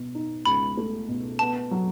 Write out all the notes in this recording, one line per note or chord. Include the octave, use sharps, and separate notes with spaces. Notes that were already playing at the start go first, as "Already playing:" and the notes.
Already playing: B2
D#4
C#2 B5
A3
B2
B3 A5
F#3